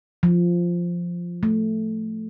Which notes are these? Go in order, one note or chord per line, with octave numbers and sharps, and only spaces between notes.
F3
A3